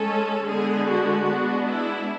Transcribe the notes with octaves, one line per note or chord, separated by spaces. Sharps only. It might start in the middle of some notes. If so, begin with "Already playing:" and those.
Already playing: G#3 C#4 A4
D3 G#3 B3 G#4
F#4
G#3 B3 D4
E4